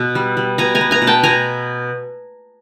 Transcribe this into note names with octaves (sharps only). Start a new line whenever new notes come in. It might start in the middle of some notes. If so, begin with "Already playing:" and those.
Already playing: B2
G3
G3
B2 G#5 A#5
G#5 A#5
B3
G#5 A#5
B2
G5 A5
B2 G#5 A#5